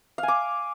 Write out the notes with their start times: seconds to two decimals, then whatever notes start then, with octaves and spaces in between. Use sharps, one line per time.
0.18 F5
0.23 G#5
0.28 D6